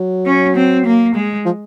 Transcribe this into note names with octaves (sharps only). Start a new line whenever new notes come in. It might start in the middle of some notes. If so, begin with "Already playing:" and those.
Already playing: F#3
C#4
C4
A#3
G#3
F3